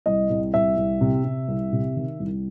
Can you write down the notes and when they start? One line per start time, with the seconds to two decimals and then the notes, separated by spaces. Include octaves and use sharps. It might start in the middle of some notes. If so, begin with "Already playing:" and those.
0.06 C2 D#5
0.30 C2
0.54 C2 E5
0.77 C2
1.01 C3
1.25 C3
1.48 C2
1.72 C3
1.96 D#3
2.20 C2